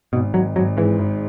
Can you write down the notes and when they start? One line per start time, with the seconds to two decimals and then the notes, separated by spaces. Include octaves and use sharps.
0.13 G#1 B2
0.34 D#3 F#3
0.56 G#1 F#3
0.77 G#2 E3
0.99 G#1